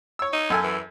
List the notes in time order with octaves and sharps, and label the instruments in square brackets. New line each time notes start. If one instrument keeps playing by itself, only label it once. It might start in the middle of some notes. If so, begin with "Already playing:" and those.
[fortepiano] C#5 E6
[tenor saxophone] D#4
[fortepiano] F#2 A4 G#5
[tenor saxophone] E3